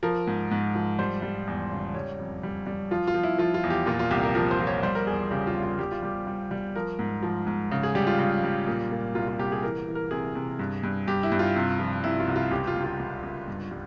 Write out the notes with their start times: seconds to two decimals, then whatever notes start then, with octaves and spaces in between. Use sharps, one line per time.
0.03 F3 A#4
0.27 G#2
0.51 G#2
0.75 F3
0.99 G3 C5
1.22 G3
1.47 E2
1.71 C#3
1.94 G3 C#5
2.19 F2
2.43 G3
2.67 G3
2.91 F3 F4
3.07 F4
3.14 F3
3.23 E4
3.38 F3 F4
3.54 F4
3.63 E2
3.70 G4
3.86 A#2 F4
3.99 F4
4.11 C2 G4
4.23 A#4
4.35 F3 A#4
4.51 C5
4.59 F3
4.67 C#5
4.83 G3 C5
4.95 A#4
5.06 E2 G#4
5.31 C#3 G4
5.47 F4
5.55 G3
5.63 F4
5.79 G3 G4
5.91 F4
6.02 G3 G4
6.27 G3
6.51 G3
6.76 F3 A#4
6.99 G#2
7.23 F3
7.47 G#2
7.71 C#3
7.83 G#4
7.95 G3 G4
8.07 F4
8.19 C#3
8.44 G3
8.67 A#2
8.91 A#2
9.15 C2 F4
9.28 F4
9.39 C2 G4
9.52 G#4
9.63 E3 A#4
9.88 E3
9.95 A#4
10.11 C3 G#4
10.35 C3
10.59 G2
10.83 G2
11.07 G2 G4
11.23 E4
11.32 G2
11.39 F4
11.56 C3
11.80 F3
12.04 C3 E4
12.20 F4
12.28 C2
12.36 F4
12.51 C#2 G4
12.67 F4
12.76 C#2
12.84 F4
13.00 C#2
13.23 C#2
13.48 G2
13.71 G3